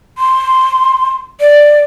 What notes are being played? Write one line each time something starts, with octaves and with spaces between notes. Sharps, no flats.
C6
D5